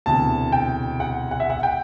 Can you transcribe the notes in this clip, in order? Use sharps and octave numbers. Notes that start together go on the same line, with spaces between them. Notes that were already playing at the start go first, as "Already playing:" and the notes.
E1 D2 C3 E3 A5
G5
F#5
F#5
E5
F#5
G5